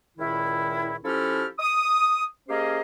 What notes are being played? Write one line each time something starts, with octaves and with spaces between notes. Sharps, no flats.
C#2 A#2 D#3 E4
F3 C#4 E4 G4 A4 F6
D#6
A#3 C#4 G4 G#4 C5 D#5